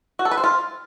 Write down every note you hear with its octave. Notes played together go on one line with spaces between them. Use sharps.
F#4
A4
B4
C5
F4